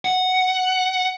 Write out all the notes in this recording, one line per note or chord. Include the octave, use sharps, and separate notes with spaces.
F#5